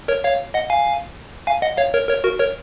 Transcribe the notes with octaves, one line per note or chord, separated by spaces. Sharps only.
A#4 C#5
C#5 F5
D#5 F#5
F5 G#5
F5 G#5
D#5 F#5
C#5 F5
A#4 C#5
A#4 C#5
F#4 A#4
A#4 C#5